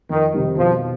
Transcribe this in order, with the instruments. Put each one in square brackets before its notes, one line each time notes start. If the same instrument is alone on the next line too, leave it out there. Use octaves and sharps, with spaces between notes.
[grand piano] F2 [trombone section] D#3
[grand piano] C3 D#3 G3
[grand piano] B2 [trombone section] F3